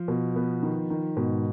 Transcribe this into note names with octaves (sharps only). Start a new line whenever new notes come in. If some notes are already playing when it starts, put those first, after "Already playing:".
Already playing: F3
B2
B3
D#3
D#3
G#2 B2